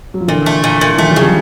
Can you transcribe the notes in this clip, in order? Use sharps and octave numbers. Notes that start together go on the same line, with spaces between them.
F#3
F3
A#2 D3 E3
A3
A#2
A#2
E3
D#3 F3 A3
E3 F#3
C#3
F3 G3